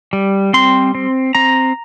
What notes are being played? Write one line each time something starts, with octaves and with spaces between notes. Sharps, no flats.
G3
C4 C6
C4
C4 A#5